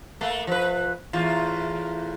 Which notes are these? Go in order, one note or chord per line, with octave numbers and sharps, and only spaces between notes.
A3 A#3
F3 B4
E2 A2 F4